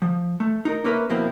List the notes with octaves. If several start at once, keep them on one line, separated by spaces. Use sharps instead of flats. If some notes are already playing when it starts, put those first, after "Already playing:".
F3
A3
D#4 A#4
A#3 C#4 A#4 B4 D5 E5
F2 B2 A#3 C4 E4